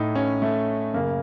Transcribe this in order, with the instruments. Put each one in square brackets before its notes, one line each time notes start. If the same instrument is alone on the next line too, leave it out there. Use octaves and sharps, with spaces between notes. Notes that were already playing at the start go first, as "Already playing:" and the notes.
Already playing: [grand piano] A2 D#4
C#4
A3
F#2 C#3 A#3